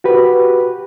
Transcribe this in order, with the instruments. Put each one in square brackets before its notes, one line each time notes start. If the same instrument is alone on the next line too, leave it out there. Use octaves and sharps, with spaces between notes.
[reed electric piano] F#4 G4 B4